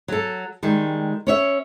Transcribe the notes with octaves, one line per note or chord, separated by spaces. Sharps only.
F#3 A4
D#3 G3 G#3
C#4 C#5 E5